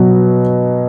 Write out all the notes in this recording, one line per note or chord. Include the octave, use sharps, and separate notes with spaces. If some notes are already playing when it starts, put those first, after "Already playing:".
Already playing: B2 F#3